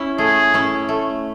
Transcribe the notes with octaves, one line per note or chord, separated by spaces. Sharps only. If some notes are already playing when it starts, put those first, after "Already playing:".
Already playing: C#4 E4
A3 G#4
C#4 E4
A3